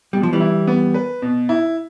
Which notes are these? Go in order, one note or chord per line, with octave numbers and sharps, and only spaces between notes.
B2 G3
F3
E3 G3
E4
B3
B4
B2
E4